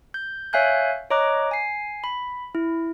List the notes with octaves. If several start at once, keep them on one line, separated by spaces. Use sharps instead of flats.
G6
C#5 E5 F5 G#5 F#6 G6
C#5 D#5 A#5 D6 F#6
G#5 C7
B5
E4